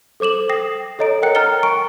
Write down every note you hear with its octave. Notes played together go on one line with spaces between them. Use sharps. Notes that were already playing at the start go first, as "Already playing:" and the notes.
A4 C5 D6 E7 F#7
G5 D#6 A#6 C7
A4 C#5 D#5 A#5 D7
A#4 C#5 F#5 G5 F#6 C#7
G5 A#5 F6 A6 C#7 G7
G5 G#5 C#6 D7